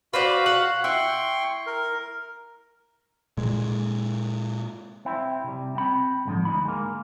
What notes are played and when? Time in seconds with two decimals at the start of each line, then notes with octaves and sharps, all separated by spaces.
0.14 F#4 B4 C5 D5 F5
0.46 F#5
0.84 E4 G5 C6 C#6
1.67 A#4
3.37 A#2 G#3
5.05 C4 E4
5.44 C3 G3
5.75 C4 B5
6.25 C#2 G#2 D3 F3
6.45 D2 B2 D#4 B5
6.65 G#3 A#3